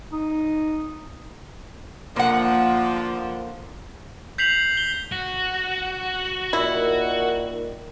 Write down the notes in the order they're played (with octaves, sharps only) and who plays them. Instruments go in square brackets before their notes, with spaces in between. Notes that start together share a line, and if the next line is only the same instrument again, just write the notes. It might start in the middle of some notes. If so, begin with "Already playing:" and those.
[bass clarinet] D#4
[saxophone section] D3 F3 [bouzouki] A#3 F#5
[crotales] G6 B6 C7 F7 F#7
G7
[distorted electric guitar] F#4
[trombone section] A#2 D#3 [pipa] E4